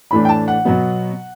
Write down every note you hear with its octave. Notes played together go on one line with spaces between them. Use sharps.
A2 E3 A3 D4 B5
G5
A5
F#5
B2 F#3 B3